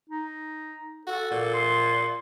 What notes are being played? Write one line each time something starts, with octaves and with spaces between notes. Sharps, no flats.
D#4
F#4 A4
A#2
C6